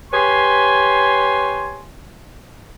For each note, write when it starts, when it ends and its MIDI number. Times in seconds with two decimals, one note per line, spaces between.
0.12 1.84 67
0.12 1.84 71
0.12 1.84 73
0.12 1.84 80
0.12 1.84 84